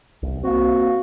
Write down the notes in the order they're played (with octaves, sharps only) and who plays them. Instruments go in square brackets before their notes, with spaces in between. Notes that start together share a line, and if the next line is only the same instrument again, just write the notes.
[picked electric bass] C2
[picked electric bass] A#3 C4 [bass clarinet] F#4